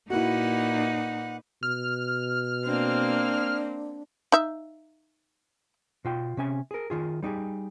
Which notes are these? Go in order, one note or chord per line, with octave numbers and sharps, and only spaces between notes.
A#2 A#3 D#4 E4 F#4 B4 F#5
B2 F6
A#3 C4 D4
D#4 E5
B2 F4 G5
C3 C#4 G#5
G#4 A#4
D#3 F4 G#4
G3 D#4 G4 G#4